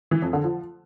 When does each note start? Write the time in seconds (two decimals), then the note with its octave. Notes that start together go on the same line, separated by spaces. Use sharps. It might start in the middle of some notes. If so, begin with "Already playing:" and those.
0.11 E3
0.22 F2
0.33 D3
0.44 F3